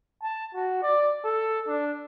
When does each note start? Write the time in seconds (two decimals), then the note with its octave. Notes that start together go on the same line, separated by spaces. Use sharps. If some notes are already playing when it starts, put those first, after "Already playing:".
0.23 A5
0.54 F#4
0.82 D5
1.25 A4
1.67 D4